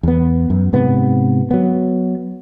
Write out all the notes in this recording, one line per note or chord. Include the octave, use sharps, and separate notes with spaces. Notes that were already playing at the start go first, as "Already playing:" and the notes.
E2 B3
F#2
G#2 C3 B3
F#3 B3